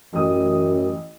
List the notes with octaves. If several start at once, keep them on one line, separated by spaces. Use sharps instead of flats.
A1 F#2 D#6